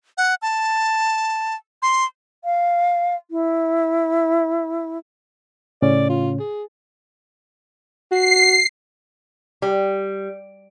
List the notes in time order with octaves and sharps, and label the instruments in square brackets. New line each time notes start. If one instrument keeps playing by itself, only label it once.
[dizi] F#5
A5
C6
[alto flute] F5
E4
[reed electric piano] A2 C#3 C#4 [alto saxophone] D5
[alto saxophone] F4
G#4
[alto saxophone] F#4 [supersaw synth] C7
[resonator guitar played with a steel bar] G3